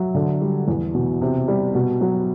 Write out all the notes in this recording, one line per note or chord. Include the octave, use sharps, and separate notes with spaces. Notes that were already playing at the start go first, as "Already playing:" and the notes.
Already playing: F#3 E5
D3
G3
E2
B2
C3
G3
B2
F#3